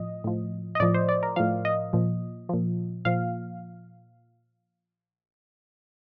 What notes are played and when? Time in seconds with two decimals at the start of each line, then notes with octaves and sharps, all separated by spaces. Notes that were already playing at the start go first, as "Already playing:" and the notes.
Already playing: A2 F3 D#5
0.24 A2 F3
0.75 D#5
0.80 A2 F3 D5
0.94 C5
1.09 D5
1.23 A#4
1.36 A2 F3 F5
1.65 D#5
1.93 A#2 F3
2.49 A#2 F3
3.05 A#2 F3 F5